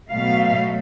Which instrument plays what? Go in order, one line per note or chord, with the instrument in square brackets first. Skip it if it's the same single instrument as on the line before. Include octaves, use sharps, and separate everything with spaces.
[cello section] B2 F5 [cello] F#3 A3